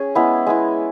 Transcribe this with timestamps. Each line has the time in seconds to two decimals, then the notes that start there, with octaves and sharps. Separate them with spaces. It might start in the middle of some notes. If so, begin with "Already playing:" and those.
Already playing: C#4 G#4
0.15 G#3 B3 E4
0.47 G#3 B3 E4